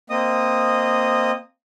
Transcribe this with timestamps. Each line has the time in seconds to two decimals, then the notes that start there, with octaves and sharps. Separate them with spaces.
0.10 A#3 C4 D#5 D#6